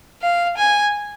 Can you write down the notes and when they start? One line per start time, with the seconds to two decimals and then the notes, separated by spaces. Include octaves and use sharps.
0.22 F5
0.57 G#5